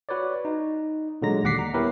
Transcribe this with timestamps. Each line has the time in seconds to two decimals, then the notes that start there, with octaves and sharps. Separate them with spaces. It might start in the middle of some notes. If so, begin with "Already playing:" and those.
0.09 F#4 B4 C#5 D5
0.45 D#4
1.22 A#2 D3 F#3 G#3 A#5 A#6
1.44 D#2 G3 F#5 D6 B6 C7
1.59 A#5
1.74 B3 E4 G4 A#4 B4 C#5